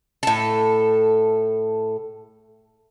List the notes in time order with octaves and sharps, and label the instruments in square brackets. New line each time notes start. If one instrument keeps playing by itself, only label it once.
[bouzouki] A2 A4